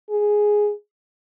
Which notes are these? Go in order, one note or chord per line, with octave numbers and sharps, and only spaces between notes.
G#4